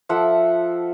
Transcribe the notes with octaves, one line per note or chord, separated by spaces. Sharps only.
F3 A4 E5 F#5